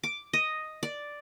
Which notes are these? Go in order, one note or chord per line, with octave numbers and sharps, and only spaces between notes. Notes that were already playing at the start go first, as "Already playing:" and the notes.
D6
D#5
D5